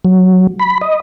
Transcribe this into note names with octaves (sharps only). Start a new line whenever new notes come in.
F#3
B5
D#5